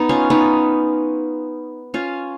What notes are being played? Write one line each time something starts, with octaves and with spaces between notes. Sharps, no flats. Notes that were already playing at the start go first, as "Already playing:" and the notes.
Already playing: B3 D#4
C#4 F4
B3 D#4
C#4 F4